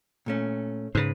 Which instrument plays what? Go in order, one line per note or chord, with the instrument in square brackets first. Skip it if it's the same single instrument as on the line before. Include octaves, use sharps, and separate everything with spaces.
[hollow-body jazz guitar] A#2 A3 C#4
[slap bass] G#2 C#3 [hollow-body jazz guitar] B4 C5